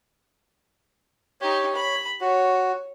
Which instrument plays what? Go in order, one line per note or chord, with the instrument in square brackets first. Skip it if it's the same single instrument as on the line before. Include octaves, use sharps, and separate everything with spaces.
[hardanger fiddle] D#4 G4 [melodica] C#5
[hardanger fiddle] B5
[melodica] F#4 [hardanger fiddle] C#5